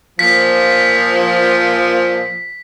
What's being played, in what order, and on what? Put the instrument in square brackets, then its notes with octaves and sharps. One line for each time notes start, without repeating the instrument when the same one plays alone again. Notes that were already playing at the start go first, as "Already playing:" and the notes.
[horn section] A#2 F3 [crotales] B6